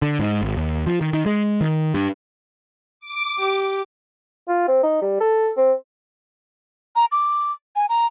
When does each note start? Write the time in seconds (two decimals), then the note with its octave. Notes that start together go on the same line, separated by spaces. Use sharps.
0.02 D3
0.19 G#2
0.42 G#1
0.57 D#2
0.87 F3
1.01 D#3
1.13 D#3
1.26 G#3
1.61 D#3
1.94 G2
3.00 D6
3.39 G4
4.48 F4
4.68 C4
4.83 D#4
5.02 G3
5.21 A4
5.57 C4
6.96 A#5
7.12 D6
7.76 G#5
7.89 A#5